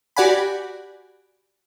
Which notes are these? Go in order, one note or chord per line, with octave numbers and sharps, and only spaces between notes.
F#4 G4 D5 F#5 G#5 B5